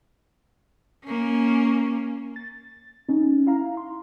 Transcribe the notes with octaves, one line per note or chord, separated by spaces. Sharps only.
A#3 C#4
A6
C#4 D#4
E4 F5 A#5
C6